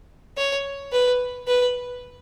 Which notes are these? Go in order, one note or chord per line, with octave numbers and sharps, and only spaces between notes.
C#5
B4
B4